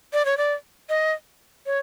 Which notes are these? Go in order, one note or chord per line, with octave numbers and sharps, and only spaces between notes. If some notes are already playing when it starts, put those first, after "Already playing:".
D5
C#5
D5
D#5
C#5